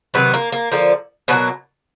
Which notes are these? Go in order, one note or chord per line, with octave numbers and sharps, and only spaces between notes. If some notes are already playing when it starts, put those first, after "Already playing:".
C3 D#3 F#3 B3
A#3
A#3
D3 F3 A#3
B2 F#3 A#3 B3